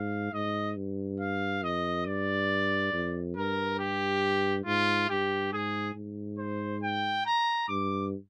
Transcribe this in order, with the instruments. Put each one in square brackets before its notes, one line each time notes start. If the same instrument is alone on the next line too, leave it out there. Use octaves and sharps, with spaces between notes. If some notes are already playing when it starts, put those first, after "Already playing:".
Already playing: [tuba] G#2 [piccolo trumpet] F5
[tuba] G#2 [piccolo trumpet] D#5
[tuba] G2
[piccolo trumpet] F5
[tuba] F2 [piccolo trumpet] D#5
[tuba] G2 [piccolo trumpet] D5
[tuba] F2
[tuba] G2 [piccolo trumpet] A#4
[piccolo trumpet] G4
[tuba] G#2 [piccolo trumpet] F4
[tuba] G2 [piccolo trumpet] G4
[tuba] G#2 [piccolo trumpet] G#4
[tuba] G#2
[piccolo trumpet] C5
G5
A#5
[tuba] G2 [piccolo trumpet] D6